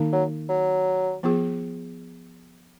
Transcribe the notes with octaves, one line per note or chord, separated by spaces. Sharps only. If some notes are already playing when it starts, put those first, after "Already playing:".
Already playing: D#3 A#3 D#4
F#3
F#3
F3 B3 F4 G#4